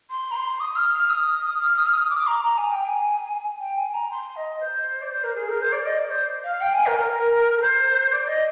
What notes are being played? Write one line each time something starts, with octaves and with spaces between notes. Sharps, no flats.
C6
A#5
C6
D#6
F6
F6
D#6
F6
D#6
F6
D#6
D6
A#5
A#5
G#5
G5
G#5
G5
G#5
A#5
C6
D#5
C5
D5
C5
A#4
G#4
A#4
C5
D5
D#5
D5
C5
F5
G5
G#5
A#4
A#4
A#4
A#4
C5
D5
D#5